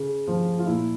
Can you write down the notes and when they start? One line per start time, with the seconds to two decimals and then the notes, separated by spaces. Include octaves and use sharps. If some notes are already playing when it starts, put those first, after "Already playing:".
Already playing: C#3
0.27 F3
0.59 F4
0.67 A#2 E4